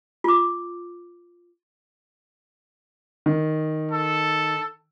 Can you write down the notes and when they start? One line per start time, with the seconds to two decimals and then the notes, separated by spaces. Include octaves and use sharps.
0.24 F4 D6
3.26 D#3
3.91 A4